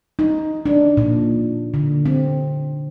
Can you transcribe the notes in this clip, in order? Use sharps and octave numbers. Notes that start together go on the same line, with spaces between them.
D#4
D4
A#2
D3
C4